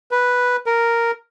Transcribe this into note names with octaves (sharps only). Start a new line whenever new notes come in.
B4
A#4